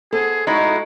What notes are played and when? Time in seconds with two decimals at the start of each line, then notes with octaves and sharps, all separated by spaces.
0.12 B3 G#4 A4 C5
0.47 G#3 A3 D#4 E4 F#4